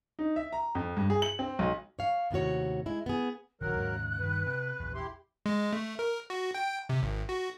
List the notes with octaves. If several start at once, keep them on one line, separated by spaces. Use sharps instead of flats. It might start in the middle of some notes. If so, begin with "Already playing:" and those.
D#4
E5
A#5
F2
G2
G#4
F#7
C4
B1
C#5 F5
D#2 A2 C3 F#4 C#5
G#3 E4
B3 G#4
F1 A#1 D#3 F#3 A#4 F#6
D#2 G#2 C#3
G2 D#3 B4
C3
A#1 E2
E4 G4 C6
G#3
A3
A#4
F#4
G5
C3
G#1
F#4